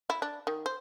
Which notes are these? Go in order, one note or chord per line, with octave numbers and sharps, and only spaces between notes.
E4
D4
D#3
C5